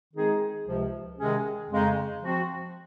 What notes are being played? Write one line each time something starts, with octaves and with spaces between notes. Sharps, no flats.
D#3 G#3 C4 D#4 G#4
C#2 C3 F3
C3 D#3 G#3 C#4 G#4
F2 C#3 G#3 D#4
F3 C4 F#4